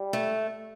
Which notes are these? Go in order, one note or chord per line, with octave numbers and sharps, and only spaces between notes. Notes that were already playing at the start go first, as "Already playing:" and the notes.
Already playing: G3
A3